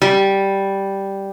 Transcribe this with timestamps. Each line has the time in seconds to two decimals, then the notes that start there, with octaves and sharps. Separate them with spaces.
0.02 G3